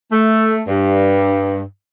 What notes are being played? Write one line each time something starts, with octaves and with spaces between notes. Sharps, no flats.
A3
G2